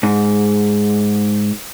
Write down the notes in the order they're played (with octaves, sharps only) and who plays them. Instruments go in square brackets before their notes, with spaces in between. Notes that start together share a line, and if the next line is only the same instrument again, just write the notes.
[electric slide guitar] G#2